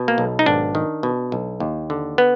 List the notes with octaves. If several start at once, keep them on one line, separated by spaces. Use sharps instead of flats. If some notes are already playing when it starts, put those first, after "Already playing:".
Already playing: B2
A#3
B1
D#4
G#1 D4
D#3
B2
B1
D#2
D3
B3